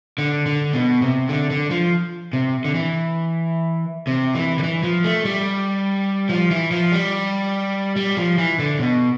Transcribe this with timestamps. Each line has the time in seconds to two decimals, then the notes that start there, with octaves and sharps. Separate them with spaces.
0.18 D3
0.46 D3
0.73 B2
1.02 C3
1.29 D3
1.51 D3
1.70 F3
2.33 C3
2.65 D3
2.75 E3
4.07 C3
4.35 E3
4.59 D3
4.63 E3
4.83 F3
5.04 A3
5.25 G3
6.29 F3
6.51 E3
6.71 F3
6.92 G3
7.96 G3
8.17 F3
8.38 E3
8.59 D3
8.79 B2